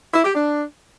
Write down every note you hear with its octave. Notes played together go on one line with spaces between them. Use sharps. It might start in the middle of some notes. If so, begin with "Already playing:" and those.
E4
G4
D4